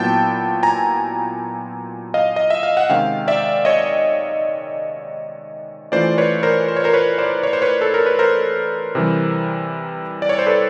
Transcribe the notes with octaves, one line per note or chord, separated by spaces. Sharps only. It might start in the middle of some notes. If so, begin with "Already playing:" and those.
Already playing: A#2 F#3 B3 E4 G5 A5
G#5 A#5
D#5 F5
D#5
E5
F5
F#5
C3 D#3 G#3 C#4 F5 G5
D5 E5
C#5 D#5
E3 A3 C#4 F4 C5 D5
B4 C#5
A#4 C5
C5
C#5
A#4 C5
B4 C#5
C5 D5
C#5
C5
B4 C#5
A4
A#4
B4
A#4 C5
C3 E3 G3
D5
C#5
C5
A4 B4